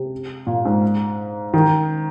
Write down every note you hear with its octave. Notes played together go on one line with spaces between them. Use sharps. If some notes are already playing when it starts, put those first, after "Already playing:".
Already playing: C3
A#2
G#2
D#3